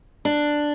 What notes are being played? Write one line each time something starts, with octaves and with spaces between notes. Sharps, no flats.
D4